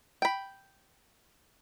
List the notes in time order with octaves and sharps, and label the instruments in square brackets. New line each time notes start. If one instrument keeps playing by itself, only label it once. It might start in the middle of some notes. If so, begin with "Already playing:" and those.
[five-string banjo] G5 B5